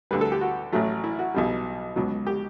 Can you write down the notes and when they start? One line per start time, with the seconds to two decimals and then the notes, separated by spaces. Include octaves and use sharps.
0.11 D2 D3 G3 B4
0.21 A4
0.32 G4
0.41 F#4
0.72 A1 A2 F#3 A3
1.04 E4
1.19 F#4
1.34 B1 B2 G3
1.96 C#2 B2 F#3
2.27 G4